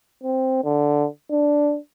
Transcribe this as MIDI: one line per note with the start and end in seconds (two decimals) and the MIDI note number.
0.23 0.61 60
0.64 1.07 50
1.30 1.77 62